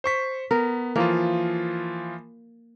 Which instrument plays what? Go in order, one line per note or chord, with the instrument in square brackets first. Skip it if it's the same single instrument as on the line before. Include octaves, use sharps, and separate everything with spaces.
[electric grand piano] C5 C#6 B6
[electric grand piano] B3 [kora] A#4
[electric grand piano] E3 F3 F4 [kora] A#3